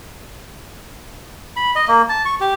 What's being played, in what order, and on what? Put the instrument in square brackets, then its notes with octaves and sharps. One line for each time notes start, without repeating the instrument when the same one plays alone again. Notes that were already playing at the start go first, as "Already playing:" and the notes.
[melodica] B5
D#5
A#3
A5
C#6
G4